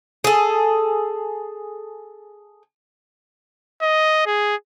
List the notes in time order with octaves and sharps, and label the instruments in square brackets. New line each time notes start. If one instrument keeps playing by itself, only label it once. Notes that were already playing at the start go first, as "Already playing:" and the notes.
[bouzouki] G#4 A4
[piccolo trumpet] D#5
G#4